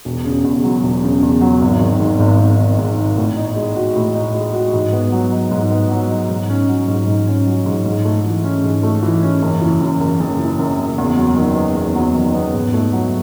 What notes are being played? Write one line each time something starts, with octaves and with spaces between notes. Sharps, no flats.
E1
C#3
E2
F#3
E1
C#3
E2
F#3
G#1
D#3
G#2
G#1
G#1
D#3
G#2
G#1
A2
D#4
G#3
F#4
A2
D#4
G#3
F#4
G#2
B3
F#3
D#4
G#2
B3
F#3
D#4
G#2
C#4
F#3
G#2
G#2
C#4
F#3
G#2
G#2
A3
E3
C#4
G#2
A3
E3
C#4
F#1
E3
F#2
F#1
F#1
E3
F#2
F#1
E2
F#3
D#3
B3
E2
F#3
D#3
B3
G#2
A3
F#3